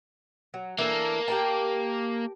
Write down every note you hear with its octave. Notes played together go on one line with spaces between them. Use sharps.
F#3
E3 A#3 D4 A4
G4 A#4 A5